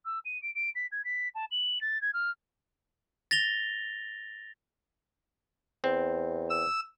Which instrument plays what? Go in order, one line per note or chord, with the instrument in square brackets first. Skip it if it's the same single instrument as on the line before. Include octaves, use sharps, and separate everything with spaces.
[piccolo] E6
D#7
D7
D7
B6
G#6
B6
A5
F#7
A6
G#6
F6
[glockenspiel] A6 A#6 F7 G7
[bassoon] E2 [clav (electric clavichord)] C4
[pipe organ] E6